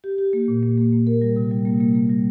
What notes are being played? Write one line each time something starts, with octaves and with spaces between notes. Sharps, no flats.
G4
G4
A#3
A#2
A#3
A#3
A#3
A#4
G3
C3
G3
A#3
A#3
A#3
G3